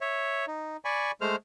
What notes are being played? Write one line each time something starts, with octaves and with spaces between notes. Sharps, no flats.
C#5 E5
D#4
D5 G#5 B5 C#6
G#3 A3 C5 F6